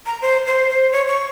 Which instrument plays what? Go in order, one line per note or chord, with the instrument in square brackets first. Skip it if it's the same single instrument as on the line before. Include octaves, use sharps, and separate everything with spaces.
[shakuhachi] A#5
C5
C5
C5
C#5
C#6